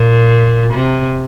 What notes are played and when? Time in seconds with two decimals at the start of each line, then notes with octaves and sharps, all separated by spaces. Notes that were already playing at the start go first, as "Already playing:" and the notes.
Already playing: A#2
0.74 C3